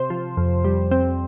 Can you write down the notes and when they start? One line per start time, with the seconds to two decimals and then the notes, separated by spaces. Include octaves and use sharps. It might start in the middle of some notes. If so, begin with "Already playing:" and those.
Already playing: C3 C5
0.10 F3
0.37 F2
0.65 G3
0.91 C4